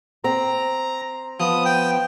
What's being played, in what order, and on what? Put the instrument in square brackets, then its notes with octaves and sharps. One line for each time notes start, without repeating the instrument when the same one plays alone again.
[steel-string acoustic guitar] C4 [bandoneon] A#5
[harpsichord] F3 [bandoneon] B3 [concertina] D#6
[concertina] G5